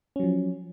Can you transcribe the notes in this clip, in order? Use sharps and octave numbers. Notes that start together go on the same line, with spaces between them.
F3 F#3 C#4